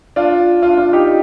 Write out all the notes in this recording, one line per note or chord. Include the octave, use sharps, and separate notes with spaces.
D4 F4
D4 F4
D4 F4
D#4 G4